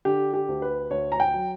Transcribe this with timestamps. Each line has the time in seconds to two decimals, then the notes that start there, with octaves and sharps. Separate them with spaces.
0.05 D3 G4
0.34 G4
0.48 D2
0.62 B4
0.91 D2 C#5
1.12 A#5
1.20 G5
1.34 F#3